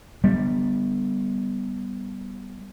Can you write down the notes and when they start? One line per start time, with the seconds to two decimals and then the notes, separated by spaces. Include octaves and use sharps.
0.24 G3 B3